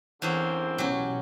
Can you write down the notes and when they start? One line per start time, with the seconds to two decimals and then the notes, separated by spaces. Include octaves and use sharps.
0.22 E2 D3 A#3 C4 C#4 G#4
0.78 B1 B2 F#3 C#4 G4